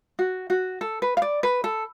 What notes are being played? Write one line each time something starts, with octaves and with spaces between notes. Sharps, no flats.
F#4
F#4
A4
B4
F5
D5
B4
A4